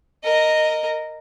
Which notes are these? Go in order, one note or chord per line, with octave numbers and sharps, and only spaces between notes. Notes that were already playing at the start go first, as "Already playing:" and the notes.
A#4 D#5